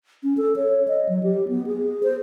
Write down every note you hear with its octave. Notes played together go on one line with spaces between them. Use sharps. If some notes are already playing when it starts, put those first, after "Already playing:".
C#4
A4
C#5
D#5
F#3
G4
B3
G#4
C5